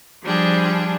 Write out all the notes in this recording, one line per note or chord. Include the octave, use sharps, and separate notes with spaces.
F3 G3 D4 G#4